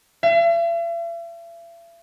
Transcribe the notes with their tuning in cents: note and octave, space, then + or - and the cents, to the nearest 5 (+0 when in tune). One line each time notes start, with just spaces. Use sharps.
E5 +45